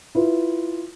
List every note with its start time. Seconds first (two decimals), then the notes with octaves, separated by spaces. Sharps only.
0.15 E4 F4 B4